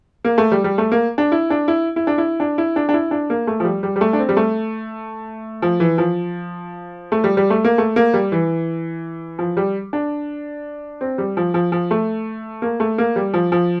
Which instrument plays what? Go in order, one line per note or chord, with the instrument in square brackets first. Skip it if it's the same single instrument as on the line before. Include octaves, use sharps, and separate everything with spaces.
[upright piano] A#3
A3
G3
G3
A3
A#3
D4
E4
D4
E4
E4
D4
E4
D4
E4
D4
D4
E4
D4
A#3
A3
F3
G3
G3
G3
A3
D4
C4
G3
A3
F3
E3
F3
A3
G3
G3
A3
A#3
A3
A#3
G3
E3
F3
G3
D4
C4
G3
F3
F3
F3
A3
A#3
A3
A#3
G3
F3
F3